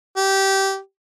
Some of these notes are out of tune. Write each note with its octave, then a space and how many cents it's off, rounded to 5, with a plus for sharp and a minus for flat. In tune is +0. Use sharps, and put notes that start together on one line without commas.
G4 -15